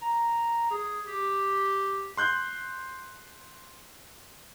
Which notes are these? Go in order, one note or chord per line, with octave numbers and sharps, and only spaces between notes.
A#5
G#4
G4
C6 F#6 G6